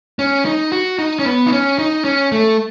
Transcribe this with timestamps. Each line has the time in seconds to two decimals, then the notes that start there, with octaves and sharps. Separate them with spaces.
0.19 C#4
0.45 D#4
0.72 F#4
0.99 D#4
1.19 C#4
1.25 B3
1.46 D#4
1.52 C#4
1.79 D#4
2.05 C#4
2.32 A3